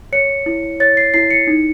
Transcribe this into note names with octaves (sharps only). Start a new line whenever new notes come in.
C#5 C#7
E4
C#5 A6
C7
E4 C7
C#7
D#4